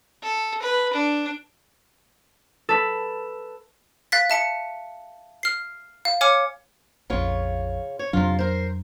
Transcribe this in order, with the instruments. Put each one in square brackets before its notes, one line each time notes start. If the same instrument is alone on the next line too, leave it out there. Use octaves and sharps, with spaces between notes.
[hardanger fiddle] A4
B4
D4
[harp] A4 B4
[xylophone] F5 F#6 A6 B6
E5 A5 C#7
F6 C7
F5
C#5 G#5 D6 F6 C#7
[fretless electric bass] A#1 F2 [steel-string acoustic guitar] C#3 F4 C#5
[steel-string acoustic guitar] C#5
[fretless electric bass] F2 F#3 D4 [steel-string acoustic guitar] C3 F4
[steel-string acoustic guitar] A#4 C5